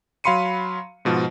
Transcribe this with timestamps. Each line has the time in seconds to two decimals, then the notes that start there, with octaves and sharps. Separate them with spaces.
0.24 F#3 F5 B5 C6 C#7 D#7
1.05 G#2 B2 F3